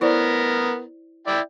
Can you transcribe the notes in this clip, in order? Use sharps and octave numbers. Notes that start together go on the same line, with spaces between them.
B3 E4 A#4 C5 D5
E4 D5 G5